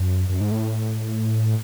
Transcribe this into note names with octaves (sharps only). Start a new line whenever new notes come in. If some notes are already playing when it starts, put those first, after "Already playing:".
Already playing: F#2
F#2
G#2
A2